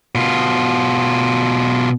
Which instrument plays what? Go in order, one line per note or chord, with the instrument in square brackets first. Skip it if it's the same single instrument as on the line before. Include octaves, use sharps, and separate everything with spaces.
[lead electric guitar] B2 F4